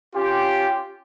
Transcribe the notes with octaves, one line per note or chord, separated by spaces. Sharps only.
C#4 F4 G4